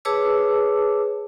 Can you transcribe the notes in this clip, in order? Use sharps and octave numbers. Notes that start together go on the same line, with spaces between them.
G#4 B4 C#5 A5 D6 E6